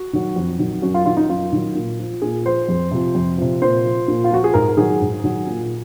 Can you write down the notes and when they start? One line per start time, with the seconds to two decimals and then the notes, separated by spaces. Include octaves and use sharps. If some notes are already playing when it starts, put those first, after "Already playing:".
Already playing: F#4
0.13 D#3 F#3
0.36 F2
0.59 D#3 F#3
0.82 F#2 F#4
0.94 F4
1.05 D#3 F#3 F4
1.17 D#4
1.29 F#2 F4
1.52 D#3 F#3
1.75 A#2
1.99 F3
2.22 A#2 G#4
2.45 F3 C5
2.68 F2
2.91 C3 F3
3.15 F2
3.38 C3 F3
3.62 A#2 C5
3.84 F3
4.08 A#2
4.24 F4
4.31 F3 F#4
4.44 G#4
4.54 G#2 A#4
4.77 D#3 F#3 G#4
5.01 G#2
5.24 D#3 F#3
5.47 A#2